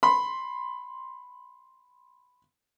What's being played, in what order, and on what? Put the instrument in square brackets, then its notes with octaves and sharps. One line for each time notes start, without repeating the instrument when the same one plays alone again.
[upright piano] B5 C6